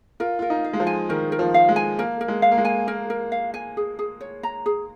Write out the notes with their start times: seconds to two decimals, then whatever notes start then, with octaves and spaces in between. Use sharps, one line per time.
0.20 F4 A#4
0.39 F4 A#4
0.50 D#4
0.64 F5
0.73 G#3
0.80 F3
0.87 G#5
1.09 D#3 A#4
1.32 A#4
1.39 F3
1.54 F5
1.69 G#3
1.76 G#5
1.98 A#3 A#4
2.21 A#4
2.28 G#3
2.42 F5
2.51 A#3
2.58 G#3
2.65 G#5
2.87 A#3 A#4
3.10 A#4
3.32 F5
3.54 G#5
3.77 G#4
3.99 G#4
4.21 C#5
4.43 A#5
4.66 G#4